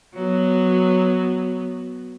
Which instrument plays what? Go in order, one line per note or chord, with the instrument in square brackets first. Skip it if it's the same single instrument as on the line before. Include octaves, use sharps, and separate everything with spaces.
[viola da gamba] F#3 B3